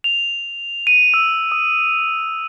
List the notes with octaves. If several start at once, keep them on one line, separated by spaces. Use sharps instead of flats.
F7
D#7
E6
D#6